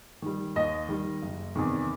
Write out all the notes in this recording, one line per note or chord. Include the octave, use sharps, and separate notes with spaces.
D#3 G3
D#2 D#5
D#3 G3
F#1
E2 C3 D#3